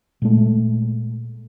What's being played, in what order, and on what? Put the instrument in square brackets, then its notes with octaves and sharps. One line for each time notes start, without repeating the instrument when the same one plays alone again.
[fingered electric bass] A#2 G#3 A3